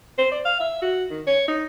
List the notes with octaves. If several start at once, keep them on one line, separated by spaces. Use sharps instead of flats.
C5
D5
F5
E5
F#4
D#3
C#5
D#4